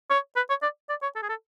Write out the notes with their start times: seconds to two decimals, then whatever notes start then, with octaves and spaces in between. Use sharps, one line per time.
0.10 C#5
0.36 B4
0.50 C#5
0.63 D5
0.89 D5
1.02 C#5
1.16 A4
1.22 G#4
1.29 A4